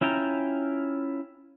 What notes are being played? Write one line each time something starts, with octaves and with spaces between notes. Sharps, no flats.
C#4 E4 F4 G5 A#5